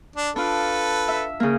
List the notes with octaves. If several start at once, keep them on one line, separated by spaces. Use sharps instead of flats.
D4
D4 F4 A4 B4
E5
C#3 A#3